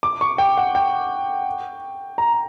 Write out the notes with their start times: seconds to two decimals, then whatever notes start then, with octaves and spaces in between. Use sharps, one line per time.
0.03 D6
0.21 C#6
0.38 G5
0.58 F#5
0.75 G5
2.18 A#5